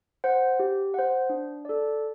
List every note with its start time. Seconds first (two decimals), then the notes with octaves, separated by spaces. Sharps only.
0.24 C5 F#5
0.60 G4
0.94 C5 F#5
1.30 D4
1.65 A4 D5